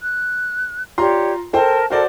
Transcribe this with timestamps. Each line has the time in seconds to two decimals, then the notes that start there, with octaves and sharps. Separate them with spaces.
0.01 F#6
0.98 F4 G4 C#5 D5 A#5 C6
1.53 A4 A#4 C5 G5 A5
1.90 F#4 A4 A#4 C5 D5 F#5